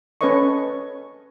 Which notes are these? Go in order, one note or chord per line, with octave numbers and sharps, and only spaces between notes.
C#4 A4 B4 C#5 D#5 C#6